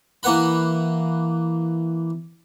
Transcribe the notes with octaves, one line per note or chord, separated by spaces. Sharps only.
E3 A#3 B4 F#5 B5